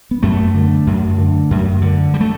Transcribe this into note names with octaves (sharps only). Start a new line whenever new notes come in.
B3
F#2 A3
D3
F#2
D3
F#2
D3
G3
A3